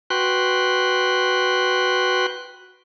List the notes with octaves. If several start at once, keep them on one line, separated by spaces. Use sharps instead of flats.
F#4 B4 G5 C6 F#6